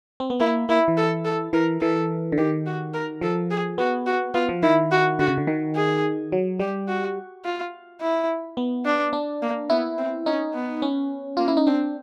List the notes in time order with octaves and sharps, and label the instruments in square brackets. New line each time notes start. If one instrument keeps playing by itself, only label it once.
[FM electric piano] C4
B3
[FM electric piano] A#3 [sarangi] E4
[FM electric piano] A#3 [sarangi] E4
[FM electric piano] E3
[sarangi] A4
A4
[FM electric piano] E3 [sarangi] A#4
[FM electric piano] E3 [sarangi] A4
[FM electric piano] D3
[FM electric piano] D#3 [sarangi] G4
[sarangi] F#4
A#4
[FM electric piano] F3 [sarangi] A4
[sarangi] G#4
[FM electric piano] B3 [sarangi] F#4
[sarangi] F#4
[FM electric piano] B3 [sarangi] F4
[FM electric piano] F3
[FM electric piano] D#3 [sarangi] E4
[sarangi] F#4
[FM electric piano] D3 [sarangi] F#4
[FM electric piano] C#3
D3
D#3
[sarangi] G#4
[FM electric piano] F#3
[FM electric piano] G3 [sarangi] G4
[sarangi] F#4
F4
E4
[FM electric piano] B3
[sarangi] D4
[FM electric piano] D4
[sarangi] A#3
[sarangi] B3 [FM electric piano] E4
[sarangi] C4
[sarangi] C#4 [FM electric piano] D#4
[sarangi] B3
[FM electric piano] C#4
[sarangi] A#3 [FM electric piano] F4
[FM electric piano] E4
D#4
[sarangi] C4 [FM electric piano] D4